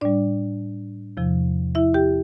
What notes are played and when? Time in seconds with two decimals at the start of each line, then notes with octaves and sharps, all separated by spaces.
0.01 A2 G3 D4 D5
1.17 E2 C3 F3
1.75 E4 E5
1.94 G4 G5